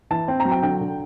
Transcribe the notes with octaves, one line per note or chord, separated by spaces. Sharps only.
E3 A5
C4
A#5
F#3
G5
D3 G5
D3